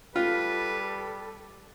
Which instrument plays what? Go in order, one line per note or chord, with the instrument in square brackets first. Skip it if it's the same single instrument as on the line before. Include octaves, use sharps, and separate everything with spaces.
[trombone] G3 [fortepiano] F4 [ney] A4 [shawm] B4